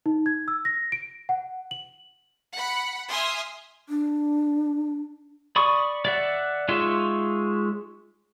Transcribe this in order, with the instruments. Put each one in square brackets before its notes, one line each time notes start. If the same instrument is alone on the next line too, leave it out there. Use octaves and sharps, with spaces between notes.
[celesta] D#4
G#6
E6
A#6
D7
F#5
F#7
[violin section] F#5 B5
E5 G#5 C6 D#6 F6
[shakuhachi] D4
[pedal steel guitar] D5 B5 C#6 D#6
D5 E5 F#5
G#3 D#4 F4 C#5 E5